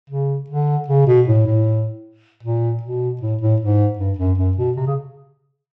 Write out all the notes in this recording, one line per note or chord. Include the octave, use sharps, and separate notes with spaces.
C#3
D3
C#3
B2
A2
A2
A#2
B2
A2
A2
G#2
G2
F#2
F#2
B2
C3
C#3